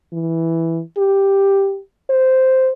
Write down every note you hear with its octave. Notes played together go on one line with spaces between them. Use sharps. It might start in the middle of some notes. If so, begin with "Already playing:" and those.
E3
G4
C5